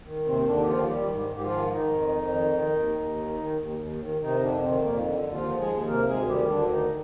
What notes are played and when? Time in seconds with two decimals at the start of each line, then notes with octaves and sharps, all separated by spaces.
0.05 D#3
0.25 D#2 C3 C4
0.46 D#2 D3 D4
0.62 G4
0.67 D#3 F3 F4
0.88 D#3 G3 G4
1.08 G#2
1.29 G#2
1.38 G4
1.43 F3 F4
1.51 D#3
1.71 D#3 D#4
1.92 F2
2.13 F2
2.34 D#3
2.54 D#3
2.75 D#2
2.96 D#2
3.17 D#3
3.38 D#3
3.59 D#2
3.79 D#2
4.00 D#3
4.21 C3 D#3 D#4
4.41 F2 D3 D4
4.62 C3 D#3 C4
4.83 F2 A#2 A#3
5.04 D3
5.25 D#2
5.32 F3 F4
5.46 F3
5.59 G#3 G#4
5.67 D#2
5.87 C3 A#3 A#4
6.08 D2 G#3 G#4
6.29 D#3 G3 G4
6.50 D2 D3 D4
6.70 D#3 D#4